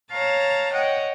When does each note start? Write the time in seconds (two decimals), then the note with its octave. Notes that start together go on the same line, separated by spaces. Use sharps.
0.11 C#5 F5 A5 A#5 A6
0.72 C#5 D#5 F#5 G5